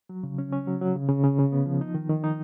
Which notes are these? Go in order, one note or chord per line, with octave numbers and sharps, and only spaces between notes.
F#3
C#3
C#4
C#4
F#3
F#3
C#3
C#3
C#3
C#3
B3
F3
D#4
D#3
D#3
D#4